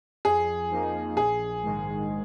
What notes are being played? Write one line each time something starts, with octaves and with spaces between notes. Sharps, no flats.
F2 G#4
F3 A#3 D#4
A#1 G#4
G#2 D#3 G#3